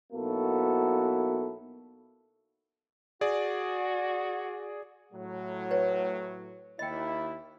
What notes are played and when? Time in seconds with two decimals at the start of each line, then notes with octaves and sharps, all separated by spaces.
0.13 B1 A#3 B3 E4 F#4 A4
3.21 F#4 G#4 D5
5.11 A2 F#3
5.71 B4 C#5
6.79 D#2 E4 D#5 G5